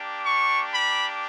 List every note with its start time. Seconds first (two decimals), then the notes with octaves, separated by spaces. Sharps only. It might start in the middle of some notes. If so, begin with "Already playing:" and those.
Already playing: A#3 D4 G4
0.26 C#6
0.74 B5